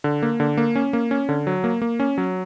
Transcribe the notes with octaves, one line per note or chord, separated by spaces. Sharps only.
D3
A#3
D3
A#3
C#4
A#3
C#4
D3
F#3
A#3
A#3
C#4
F#3